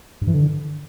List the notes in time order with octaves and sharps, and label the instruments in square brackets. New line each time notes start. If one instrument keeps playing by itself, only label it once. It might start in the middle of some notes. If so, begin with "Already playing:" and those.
[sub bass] G2
E3
D3